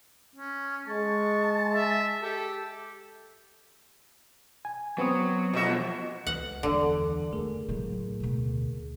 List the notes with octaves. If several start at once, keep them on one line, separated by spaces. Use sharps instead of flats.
C#4
G#3 A5 C#6
E5
G4 A4
G#5
F#3 B3 C4 D#6
F2 B2 F3 F#4 E5
C#2 F#5
E2 G2 D3
F1 A3 G#4 A#4
A2 F#3
D2 B2